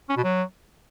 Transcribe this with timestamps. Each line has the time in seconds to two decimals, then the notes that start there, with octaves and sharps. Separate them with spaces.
0.09 C#4
0.17 B2
0.24 F#3